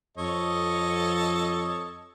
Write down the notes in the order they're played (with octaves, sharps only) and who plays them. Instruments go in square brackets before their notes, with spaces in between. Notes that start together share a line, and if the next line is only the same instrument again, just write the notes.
[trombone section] F2 [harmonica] A4 C#5 D#5